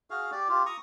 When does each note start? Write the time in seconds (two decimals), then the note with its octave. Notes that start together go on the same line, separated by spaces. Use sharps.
0.10 F#4 G#4 F5
0.32 G4 D5
0.49 F4 G4
0.66 A#5 C#6 D#6